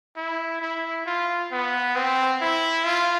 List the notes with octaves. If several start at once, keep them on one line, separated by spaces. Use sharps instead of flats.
E4
E4
F4
B3
C4
E4
F4